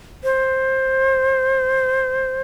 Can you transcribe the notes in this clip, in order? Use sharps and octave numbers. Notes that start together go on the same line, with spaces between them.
C5